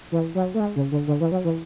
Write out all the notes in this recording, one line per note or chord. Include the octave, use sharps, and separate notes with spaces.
E3
F#3
A3
G#3
C#3
D3
D3
E3
F#3
E3